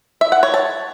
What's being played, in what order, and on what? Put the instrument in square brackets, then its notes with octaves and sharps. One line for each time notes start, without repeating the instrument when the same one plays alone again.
[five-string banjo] E5
F#5
C#5
A5